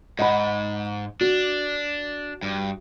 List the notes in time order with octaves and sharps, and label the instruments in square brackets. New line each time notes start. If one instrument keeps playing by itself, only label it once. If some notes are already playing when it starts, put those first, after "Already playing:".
[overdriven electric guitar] G#2 [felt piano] D#5 F#5 B5
[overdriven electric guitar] D4 [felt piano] F#4
[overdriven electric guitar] G2